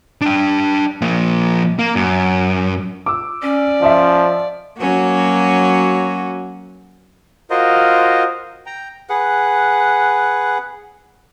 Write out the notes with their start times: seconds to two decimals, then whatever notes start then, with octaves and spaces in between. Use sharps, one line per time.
0.21 D4 G5
1.02 F3 A#3
1.79 A#3
1.96 F#2
3.06 D6 E6
3.42 C#4 D5
3.82 F3 D#5 E5
4.79 F#3 A#3 C#4 F#4
7.50 F4 F#4 A#4 C5 D#5
8.66 G5 A#5
9.09 G#4 B4 F#5